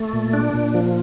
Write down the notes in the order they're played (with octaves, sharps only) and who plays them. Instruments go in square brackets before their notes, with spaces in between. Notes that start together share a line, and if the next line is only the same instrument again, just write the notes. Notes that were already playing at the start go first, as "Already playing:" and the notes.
Already playing: [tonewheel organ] A3
A#2
D4
A#2
F3